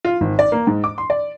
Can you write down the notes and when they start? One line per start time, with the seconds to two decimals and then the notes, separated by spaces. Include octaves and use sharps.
0.05 F4
0.21 G#1
0.39 D5
0.52 A#3
0.67 G#2
0.84 D6
0.98 C6
1.10 D5